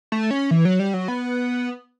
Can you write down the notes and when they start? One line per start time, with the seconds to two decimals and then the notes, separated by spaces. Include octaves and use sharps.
0.12 A3
0.31 C#4
0.51 E3
0.65 F#3
0.79 G3
0.94 F#3
1.08 B3